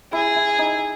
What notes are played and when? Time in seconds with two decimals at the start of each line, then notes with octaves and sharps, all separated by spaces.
0.13 E4 G#4
0.36 E4
0.59 D#4